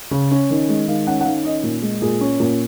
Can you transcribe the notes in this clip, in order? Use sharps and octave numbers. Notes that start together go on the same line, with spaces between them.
C#3
C#4
D#3
G#3
D#3 F5
C#4 F#5
F#5
D#3 F5
C#4 D#5
A#2
G#3
A#2 G#4
C#4
A#2